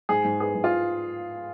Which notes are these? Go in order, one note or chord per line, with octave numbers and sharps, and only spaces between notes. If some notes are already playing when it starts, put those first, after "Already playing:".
G#2 G#4
G#2
B3 G#4
G#2
F4